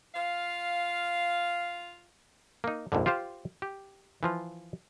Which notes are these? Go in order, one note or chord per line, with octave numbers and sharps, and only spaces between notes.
F4 F5
A#3 D#4
A#1 F2 G#2 D3
F4 G4 C5 F5
G4
E3 F3 F4